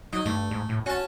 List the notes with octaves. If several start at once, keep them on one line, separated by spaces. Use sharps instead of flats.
F#3 D#4
G2 A3
G#2
A2
C#4 F#4 A5